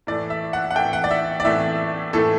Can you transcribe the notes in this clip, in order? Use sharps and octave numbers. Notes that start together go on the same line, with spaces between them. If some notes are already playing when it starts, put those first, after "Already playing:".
A2 E3 A3 D5
E5
F#5
F#5
A2 E3 A3 G5
F#5
D5
E5
D5
A2 E3 A3 E5
A2 E3 A3 A4